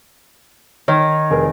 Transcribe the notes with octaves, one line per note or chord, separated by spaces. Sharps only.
D#3 C#5
F1 G#4 A#4